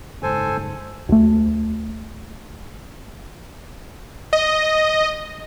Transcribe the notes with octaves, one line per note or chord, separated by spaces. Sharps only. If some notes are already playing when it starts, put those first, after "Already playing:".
F#1 G#2 A4 C5 G#5
D2 A3
D#5